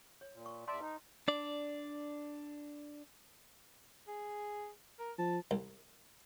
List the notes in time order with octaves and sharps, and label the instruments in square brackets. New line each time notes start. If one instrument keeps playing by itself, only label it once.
[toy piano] C#5
[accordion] A#2
[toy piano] C#6
[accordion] E2 D5 E5 [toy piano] A5 C6
[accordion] D#4 [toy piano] B4
[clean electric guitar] D4 D5
[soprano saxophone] G#4
A#4
[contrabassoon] F3 [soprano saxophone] A5
[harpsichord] C2